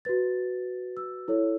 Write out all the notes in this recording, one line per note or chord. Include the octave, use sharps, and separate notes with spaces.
F#4 B4 A6
E6
E4 A4 C#5